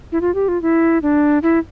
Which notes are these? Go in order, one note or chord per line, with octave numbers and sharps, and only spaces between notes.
E4
F4
G4
F4
E4
D4
E4